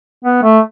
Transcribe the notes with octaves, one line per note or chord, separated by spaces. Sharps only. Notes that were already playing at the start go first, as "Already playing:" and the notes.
B3
A3